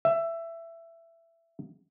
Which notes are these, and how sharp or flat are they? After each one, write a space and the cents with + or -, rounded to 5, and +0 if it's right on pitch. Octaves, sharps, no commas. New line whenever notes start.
E5 +15